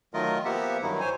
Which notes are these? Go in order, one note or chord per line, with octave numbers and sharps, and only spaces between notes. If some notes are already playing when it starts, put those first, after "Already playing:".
D#3 F#3 A3 F4 A#4 D#5
F3 A#3 B3 G4 E5 F#5
G2 D#3 F#3 D#4 E4
C5 C#5 G#5